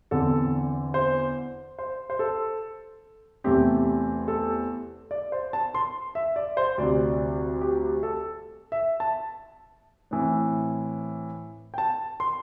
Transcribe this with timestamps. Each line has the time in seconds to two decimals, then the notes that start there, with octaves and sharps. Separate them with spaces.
0.11 E2 D3 C4 A4
0.94 C5
1.79 C5
2.10 C5
2.19 A4
3.44 E2 C3 A3 C4 G4
4.28 A4
5.11 D5
5.32 C5
5.53 A5
5.74 C6
6.15 E5
6.36 D5
6.57 C5
6.78 D2 C3 G3 C4 D5
7.61 G4
8.03 A4
8.72 E5
9.00 A5
10.11 A2 E3 C4
11.74 G5
11.78 A5
12.20 C6